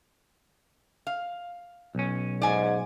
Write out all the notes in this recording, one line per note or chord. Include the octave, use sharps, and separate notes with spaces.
F5
B1 C#4
G#2 D5 G#5